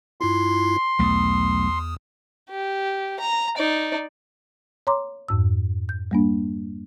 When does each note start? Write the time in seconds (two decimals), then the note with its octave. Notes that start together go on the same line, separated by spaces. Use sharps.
0.21 G2 E4 F4 C6
0.99 B1 E2 A3 D#6
2.50 G4
3.20 A#5
3.57 D#4 D5
4.87 C#5 A#5 C6 D6
5.28 F2 G#2 E6
5.89 G6
6.11 G3 A#3 D4